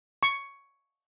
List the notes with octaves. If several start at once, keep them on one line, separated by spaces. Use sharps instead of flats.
C#6